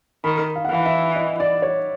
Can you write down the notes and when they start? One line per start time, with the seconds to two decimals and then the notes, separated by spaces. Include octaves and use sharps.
0.24 D#3 B5
0.56 F5
0.65 F#5
0.70 E3 F5
0.86 E5
1.16 D#5
1.40 D5
1.62 C#5